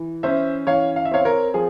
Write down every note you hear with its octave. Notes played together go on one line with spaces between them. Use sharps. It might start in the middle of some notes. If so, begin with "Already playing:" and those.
Already playing: E3
C#4 C5 E5
E3 C#5 F5
F5
E5
C4 C#5 F5
A#4 C#5
F3 G#4